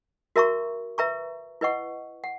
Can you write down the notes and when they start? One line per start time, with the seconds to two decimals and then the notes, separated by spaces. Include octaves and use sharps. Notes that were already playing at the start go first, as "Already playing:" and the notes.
0.36 F#4 A#4 E5 A#5 C#6
0.98 B4 E5 A#5 C#6
1.61 E4 B4 D#5 F#5 C#6
2.24 F#5